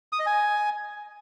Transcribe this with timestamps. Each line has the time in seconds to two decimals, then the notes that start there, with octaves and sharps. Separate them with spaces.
0.13 D#6
0.19 D#5
0.26 G#5